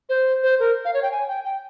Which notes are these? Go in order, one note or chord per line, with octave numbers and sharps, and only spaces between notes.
C5
C5
A#4
F5
C#5
G5
G#5
G5
G5